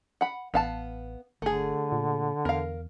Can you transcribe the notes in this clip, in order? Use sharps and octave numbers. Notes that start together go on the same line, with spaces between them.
F#5 B5
A1 B3 F5 A5
G1 D3 A3 G#4
A#2
E2 A#4 F5